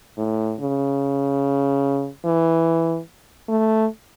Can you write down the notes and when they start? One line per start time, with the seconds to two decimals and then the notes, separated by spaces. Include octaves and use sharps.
0.18 A2
0.60 C#3
2.25 E3
3.49 A3